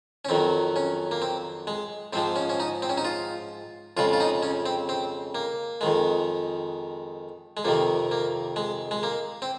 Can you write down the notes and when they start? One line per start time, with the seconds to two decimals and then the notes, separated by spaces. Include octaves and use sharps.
0.25 C#4
0.29 F2 D#3 F#3 C4
0.76 C#4
1.11 A#3
1.22 C4
1.67 G#3
2.13 G#2 F3 G#3 C4
2.36 C#4
2.50 C#4
2.60 D#4
2.82 C4
2.90 C#4
2.98 D#4
3.05 F4
3.97 F2 C#3 G#3 F4
4.13 F4
4.20 D#4
4.43 C#4
4.66 C4
4.89 C4
5.35 A#3
5.81 F2 D#3 G#3
7.57 G#3
7.65 F2 C3 D#3 A#3
8.12 A#3
8.56 G#3
8.91 G#3
9.03 A#3
9.42 C4